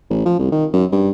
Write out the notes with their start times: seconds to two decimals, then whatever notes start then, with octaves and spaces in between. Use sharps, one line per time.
0.10 A1
0.25 F3
0.39 C2
0.52 D#3
0.73 F#2
0.92 G2